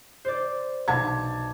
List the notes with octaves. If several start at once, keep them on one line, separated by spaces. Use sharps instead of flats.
C5 D5
B1 A5 G#6